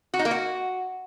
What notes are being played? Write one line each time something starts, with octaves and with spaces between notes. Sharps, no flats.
F#4
D#4
A#3
F#4